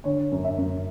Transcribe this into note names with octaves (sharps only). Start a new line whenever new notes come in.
D3 C#5
F#2
E5
F#2